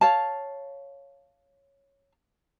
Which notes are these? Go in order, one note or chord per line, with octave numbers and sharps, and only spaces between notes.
C#5 F5 A5